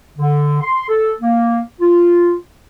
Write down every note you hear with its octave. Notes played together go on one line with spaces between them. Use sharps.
D3
C6
A4
A#3
F4